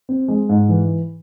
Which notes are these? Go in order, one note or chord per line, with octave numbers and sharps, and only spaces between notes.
C4
G#3
G#2
E3